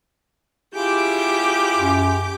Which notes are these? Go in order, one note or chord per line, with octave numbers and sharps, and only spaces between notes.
E4 F4 G4 G#4 D6 G6
F#2